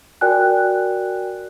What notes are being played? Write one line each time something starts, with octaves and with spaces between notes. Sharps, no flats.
F#4 A#4 D5 G5 G#5 F#6